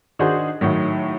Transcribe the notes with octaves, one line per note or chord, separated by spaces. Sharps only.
D#3 D4 D#4 F#4 G#4 C5
A2 D#3 F#3